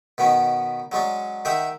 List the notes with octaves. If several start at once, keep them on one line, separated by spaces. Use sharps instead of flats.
B2 D#3 B3 C#4
F#3 G#3 C#4 D4
D#3 G4 E5 F#5